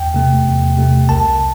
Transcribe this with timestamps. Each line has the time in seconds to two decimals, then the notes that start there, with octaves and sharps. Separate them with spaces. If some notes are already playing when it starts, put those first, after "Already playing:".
Already playing: E2 G5
0.14 C3 A3
0.46 E2
0.77 C3 A3
1.09 C2 A5